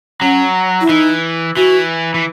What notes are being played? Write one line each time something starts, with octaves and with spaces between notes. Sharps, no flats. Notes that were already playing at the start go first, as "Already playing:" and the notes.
F#3 C#4
E4
E3 D#4
E3 F#4
E3